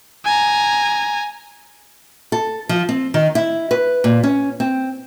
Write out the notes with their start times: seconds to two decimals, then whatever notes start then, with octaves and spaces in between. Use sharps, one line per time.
0.25 G#5 A#5
2.32 A4
2.69 F3
2.89 C4
3.14 D#3
3.35 E4
3.71 B4
4.04 A#2
4.23 C#4
4.60 C4